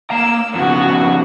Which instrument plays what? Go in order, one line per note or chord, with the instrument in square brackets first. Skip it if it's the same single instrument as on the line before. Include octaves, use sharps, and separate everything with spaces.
[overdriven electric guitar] A#3 A#5 [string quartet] E6
[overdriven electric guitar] F2 C#3 [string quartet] B3 F#4